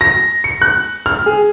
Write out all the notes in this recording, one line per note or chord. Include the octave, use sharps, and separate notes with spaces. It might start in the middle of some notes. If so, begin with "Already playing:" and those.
A#6
C#7
F#6
F6
G#4